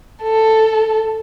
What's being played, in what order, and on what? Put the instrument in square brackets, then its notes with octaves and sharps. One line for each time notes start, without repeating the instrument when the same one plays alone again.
[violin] A4